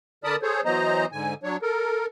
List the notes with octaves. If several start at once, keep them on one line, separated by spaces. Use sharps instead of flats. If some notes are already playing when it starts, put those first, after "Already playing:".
D3 A#4 D5 A5 B5 D#6
G#4 A4 C5 C#5
E3 F#3 B3 C5 D#5 A#5
G#2 D3 G#5
F#3 D4 C#5
A4 A#4